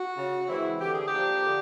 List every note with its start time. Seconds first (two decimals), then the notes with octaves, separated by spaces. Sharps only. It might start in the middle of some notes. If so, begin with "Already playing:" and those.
Already playing: F#4
0.16 C#3
0.48 E3 G#3 C4 E4
0.79 D3 G4
0.93 G#4
1.07 G4
1.12 F3 A#3 D4
1.43 D3